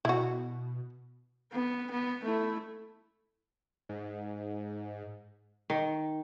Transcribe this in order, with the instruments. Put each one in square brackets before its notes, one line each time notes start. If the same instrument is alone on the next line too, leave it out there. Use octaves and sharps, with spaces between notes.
[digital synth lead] B2 [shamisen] E4 F#4
[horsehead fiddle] B3
B3
A3 E4
[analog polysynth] G#2
[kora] D#3